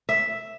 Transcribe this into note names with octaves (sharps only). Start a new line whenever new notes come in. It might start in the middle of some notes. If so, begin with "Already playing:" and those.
E5